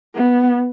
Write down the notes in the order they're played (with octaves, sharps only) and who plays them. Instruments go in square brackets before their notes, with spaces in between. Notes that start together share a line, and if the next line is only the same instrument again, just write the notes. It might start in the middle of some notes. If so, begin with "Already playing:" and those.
[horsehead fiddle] B3